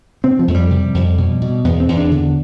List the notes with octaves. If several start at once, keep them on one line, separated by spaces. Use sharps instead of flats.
C3 C4
F3
F2 A3
G3
C3
F2
B2
B2
E2 B3
C4
E2
D4
D3